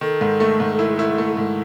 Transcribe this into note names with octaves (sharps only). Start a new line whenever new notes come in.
D#3 A4
G#2
A3
G#2
E4
E4
A3
G#2